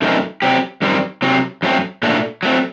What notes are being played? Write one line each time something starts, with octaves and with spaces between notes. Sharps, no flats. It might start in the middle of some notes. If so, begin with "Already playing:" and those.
F#2 D#3 A3 C4 D#4
F#3 C4 G4
F#2 D#3 G3 C4
C3 F#3 C4
F#2 F#3 A3 C4
A#2 A3 D4 F#4
F#3 A3 C4